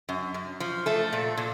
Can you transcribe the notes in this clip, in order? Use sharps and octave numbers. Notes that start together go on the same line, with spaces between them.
F#2
F#2
F3
A3 A4
A#2
A#2